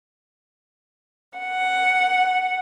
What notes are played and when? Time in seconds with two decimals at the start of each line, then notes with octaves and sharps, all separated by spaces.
1.39 F#5